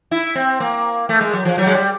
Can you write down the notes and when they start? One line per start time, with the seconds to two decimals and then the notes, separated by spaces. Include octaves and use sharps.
0.11 E4
0.35 C4
0.60 A#3
1.09 A3
1.21 G#3
1.33 F#3
1.45 F3
1.58 F#3
1.67 G#3
1.74 G3